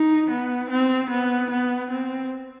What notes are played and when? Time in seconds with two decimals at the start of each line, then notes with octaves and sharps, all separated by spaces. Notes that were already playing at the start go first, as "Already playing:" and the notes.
Already playing: D#4
0.30 B3
0.70 C4
1.10 B3
1.50 B3
1.90 C4